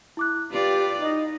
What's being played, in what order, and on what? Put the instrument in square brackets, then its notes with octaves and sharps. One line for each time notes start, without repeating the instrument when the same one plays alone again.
[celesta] E4 D6 F#6
[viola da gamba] F4 B4 D5 [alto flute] G4
[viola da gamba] D#4 [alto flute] D#5